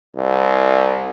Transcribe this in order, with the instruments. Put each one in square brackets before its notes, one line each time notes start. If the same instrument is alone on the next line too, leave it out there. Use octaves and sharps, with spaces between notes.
[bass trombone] C2